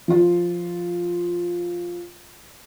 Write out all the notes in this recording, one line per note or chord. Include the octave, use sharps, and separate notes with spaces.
F3 F4